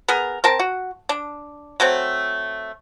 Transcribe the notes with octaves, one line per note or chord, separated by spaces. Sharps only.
B3 G#4 A#4
C4 A#4 A5
F#4
D4
F#3 A3 C4